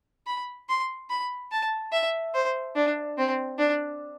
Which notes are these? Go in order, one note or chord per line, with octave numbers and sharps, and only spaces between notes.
B5
C6
B5
A5
E5
C5
D4
C4
D4